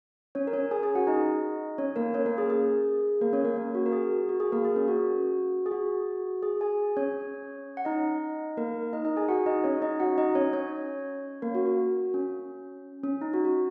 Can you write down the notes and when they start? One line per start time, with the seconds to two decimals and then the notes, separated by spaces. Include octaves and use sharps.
0.35 C#4 C#5
0.47 A#4
0.53 C#4 C#5
0.71 G#4 G#5
0.83 G#4 G#5
0.95 F#4 F#5
1.07 D#4 D#5
1.78 C#4 C#5
1.96 A#3 A#4
2.14 C#4 C#5
2.26 A#3 A#4
2.38 G#4
2.50 G#4
3.21 A#3 A#4
3.33 C#4 C#5
3.45 A#3 A#4
3.56 A#3 A#4
3.75 F#4
3.86 A#4
3.92 G#4
4.11 F#4
4.29 F#4
4.40 G#4
4.52 A#3 A#4
4.65 G#4
4.76 C#4
4.88 F#4
5.66 G#4
5.71 F#4
6.43 G#4
6.61 G#4 G#5
6.97 C#4 C#5
7.77 F#5
7.85 D#4 D#5
8.57 A#3 A#4
8.93 D#4 D#5
9.05 D#4 D#5
9.17 G#4 G#5
9.28 F#4 F#5
9.46 D#4 D#5
9.64 C#4 C#5
9.82 D#4 D#5
10.00 F#4 F#5
10.18 D#4 D#5
10.35 C#4 C#5
10.53 C#4 C#5
11.42 A#3 A#4
11.55 F#4
11.66 F#4
12.14 C#4
13.04 C#4
13.21 D#4
13.33 F#4
13.45 F#4